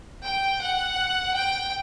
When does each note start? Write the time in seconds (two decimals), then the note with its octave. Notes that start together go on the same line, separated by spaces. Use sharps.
0.24 G5
0.62 F#5
1.34 G5